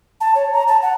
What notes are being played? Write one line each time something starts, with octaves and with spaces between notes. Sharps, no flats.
A5
C#5
A#5
A5
F#5